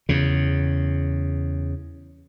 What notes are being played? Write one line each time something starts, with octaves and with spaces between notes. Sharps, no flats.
E2 C#3